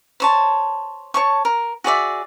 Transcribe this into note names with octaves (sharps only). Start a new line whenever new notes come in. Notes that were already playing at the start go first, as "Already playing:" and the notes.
C5 C#5 A5
C#5 A5 C#6
A#4
F#4 G#4 D5 E5